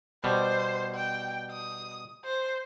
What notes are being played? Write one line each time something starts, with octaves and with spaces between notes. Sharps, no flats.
B2 G3 C5
G5
D#6
C5